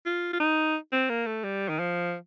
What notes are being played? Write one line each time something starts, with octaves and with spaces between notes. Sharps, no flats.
F4
F4
D#4
C4
A#3
A3
G3
D#3
F3